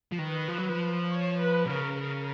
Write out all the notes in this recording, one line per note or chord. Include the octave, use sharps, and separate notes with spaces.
F3
D#3 B4
F3
F#3
F3
C#5
B4
B2
C#3 A#4
A#4